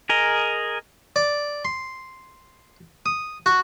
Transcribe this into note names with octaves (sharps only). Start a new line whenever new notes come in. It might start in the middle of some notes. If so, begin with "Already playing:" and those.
G#4 A#4 D#5
D5
C6
D#6
F#4